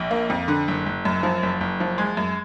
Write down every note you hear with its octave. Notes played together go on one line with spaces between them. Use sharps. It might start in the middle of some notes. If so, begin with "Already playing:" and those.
Already playing: A#1
A#3
F2
D3
F#1
F#1
F#2
F3
F#1
F#1
F3
G#3
F#2